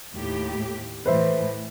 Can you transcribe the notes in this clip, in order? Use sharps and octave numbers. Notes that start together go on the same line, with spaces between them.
D#2 A2 G4
A2 E3 B4 C5 E5